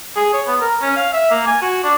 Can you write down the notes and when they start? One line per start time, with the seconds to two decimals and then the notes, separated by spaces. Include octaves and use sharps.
0.16 G#4
0.33 C#5
0.47 B3
0.61 A#4
0.82 C#4
0.96 F5
1.13 E5
1.31 A#3
1.46 G#5
1.62 F#4
1.84 D4